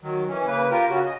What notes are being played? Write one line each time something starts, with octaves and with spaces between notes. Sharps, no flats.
D#3 F#3
E3 C#4
C#3 A#3 B4
F4 G4 A#4
C#3 C#4 F#4
D#5